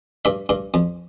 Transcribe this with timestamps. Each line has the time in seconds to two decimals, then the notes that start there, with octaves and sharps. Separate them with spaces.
0.25 G2 E5
0.49 G2
0.74 F2